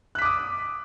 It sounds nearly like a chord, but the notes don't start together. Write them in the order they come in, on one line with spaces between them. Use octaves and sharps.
F#6 B6 D6 D#6